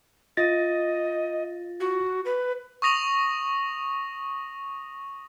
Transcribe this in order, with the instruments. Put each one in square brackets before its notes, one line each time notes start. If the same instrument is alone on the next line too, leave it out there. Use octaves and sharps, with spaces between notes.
[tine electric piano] F4 A6 A#6 [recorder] D#5
[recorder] F#4
B4
[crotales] C#6 D#6 A#6 F7 F#7